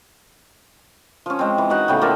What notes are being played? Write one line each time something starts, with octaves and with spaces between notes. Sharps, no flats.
F3 C#4
G#3 C4
E3
D#4 F#4 C#5 F#5
A2 C#3 B3 G5
F3 A#3 A4 D5